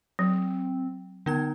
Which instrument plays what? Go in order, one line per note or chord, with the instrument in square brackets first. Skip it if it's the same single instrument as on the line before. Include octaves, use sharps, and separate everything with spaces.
[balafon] F#3 [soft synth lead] C4
[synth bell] D3 B3 G#6 [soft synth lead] D#4